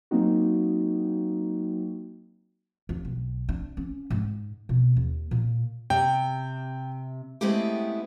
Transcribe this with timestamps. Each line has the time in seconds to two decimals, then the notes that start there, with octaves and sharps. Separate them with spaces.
0.11 F#3 A#3 C4 D#4 F#4
2.89 D#2
3.05 B1
3.49 D4
3.77 C#4
4.10 G#2
4.69 B2
4.96 D#2
5.31 A#2
5.90 C3 G5
7.41 G#3 A3 B3 C4 E4 G4